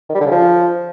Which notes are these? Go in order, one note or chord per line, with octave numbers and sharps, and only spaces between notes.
D#3
G3
D3
C#3
F3